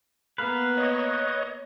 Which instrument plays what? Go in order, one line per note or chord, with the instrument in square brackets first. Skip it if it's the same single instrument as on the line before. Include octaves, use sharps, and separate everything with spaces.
[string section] A#3 B3 [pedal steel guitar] B4 F5
[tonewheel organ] C#5 D#5